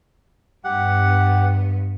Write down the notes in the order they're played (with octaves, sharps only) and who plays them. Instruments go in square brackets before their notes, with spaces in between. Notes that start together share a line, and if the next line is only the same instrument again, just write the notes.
[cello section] G2 B3 [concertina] G4 F#5